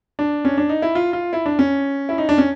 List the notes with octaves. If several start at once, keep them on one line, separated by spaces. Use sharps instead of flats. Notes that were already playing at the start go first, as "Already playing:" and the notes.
D4
C#4
D4
D#4
E4
F4
F4
E4
D4
C#4
E4
D#4
D4
C#4